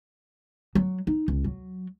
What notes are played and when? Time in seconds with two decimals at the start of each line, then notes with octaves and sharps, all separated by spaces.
0.75 F#3
1.07 D#4
1.28 C#2
1.44 F#3